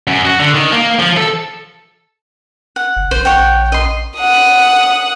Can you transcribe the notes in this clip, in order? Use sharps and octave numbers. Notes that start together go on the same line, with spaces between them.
F#2
F#4
D3
D#3
A#3
F3
A4
F#5
F#1
A#1 C5
C#5 F#5 G5
D#5 C6
F#5 D#6